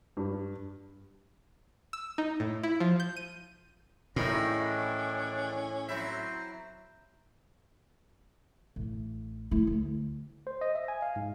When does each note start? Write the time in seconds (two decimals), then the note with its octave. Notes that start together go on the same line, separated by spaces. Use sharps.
0.17 G2
1.93 E6
2.18 D#4
2.40 A2
2.63 E4
2.80 F3
3.00 G6
3.17 D#7
4.16 E2 A2 D#3 C#4 E4 A#5
4.61 D4
5.89 F#3 C4 E4 E5
8.76 A1
9.51 A3 E4
9.67 D2
10.47 C5
10.61 D#5
10.75 E5
10.88 G#5
11.02 F5
11.16 G#2